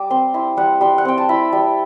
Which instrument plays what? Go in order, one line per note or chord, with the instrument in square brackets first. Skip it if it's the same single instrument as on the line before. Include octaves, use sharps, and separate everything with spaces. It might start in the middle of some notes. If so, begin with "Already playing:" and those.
Already playing: [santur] G3 D6
C4 C6
E4 C6
G3 F#5
G3 C6
F#5
C4 G5
A5
E4 B5
G3